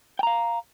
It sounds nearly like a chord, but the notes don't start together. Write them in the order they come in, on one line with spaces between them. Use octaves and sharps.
G5 A#5 F5